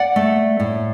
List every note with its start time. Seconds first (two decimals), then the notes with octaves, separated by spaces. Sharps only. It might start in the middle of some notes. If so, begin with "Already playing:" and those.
Already playing: D5 F#5
0.16 A3
0.60 A2